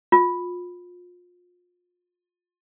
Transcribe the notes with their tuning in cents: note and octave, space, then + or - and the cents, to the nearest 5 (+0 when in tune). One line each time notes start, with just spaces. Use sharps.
F4 +30